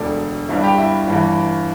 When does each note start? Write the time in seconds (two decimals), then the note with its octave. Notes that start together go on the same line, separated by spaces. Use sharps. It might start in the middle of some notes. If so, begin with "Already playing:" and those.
Already playing: E1 D2 D3 A4 D5
0.49 G1 G2 G3 D4 E4
0.63 G4
0.78 E4
1.07 G1 G2 E3